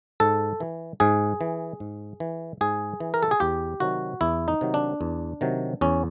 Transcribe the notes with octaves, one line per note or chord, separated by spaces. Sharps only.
G#2 A4
E3
G#2 G#4
E3
G#2
E3
G#2 G#4
E3
A#4
A4
G#4
E2 G4
C3 D#3 F#3 F#4
E2 E4
D#4
C3 D#3 F#3
D4
E2
C3 D#3 F#3
E2 C#4